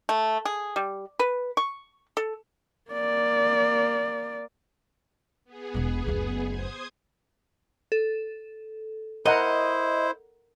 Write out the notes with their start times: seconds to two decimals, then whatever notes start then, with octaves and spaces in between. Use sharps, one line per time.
0.09 A3
0.45 G#4
0.76 G3
1.19 B4
1.57 C#6
2.17 A4
2.91 A#3 D5
5.45 B3 G#4
5.74 E1 B2
6.06 F#1 D2
6.48 C5 D#6 G#6
7.92 A4
9.26 E4 A#4 C5 D#5 F#5 A#5